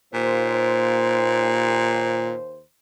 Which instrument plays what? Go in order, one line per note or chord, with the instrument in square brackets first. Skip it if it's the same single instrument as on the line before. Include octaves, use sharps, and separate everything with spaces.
[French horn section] D#2 C5 [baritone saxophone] A#2